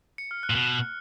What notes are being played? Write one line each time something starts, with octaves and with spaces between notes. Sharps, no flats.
C#7
F6
F#6
A#2
B2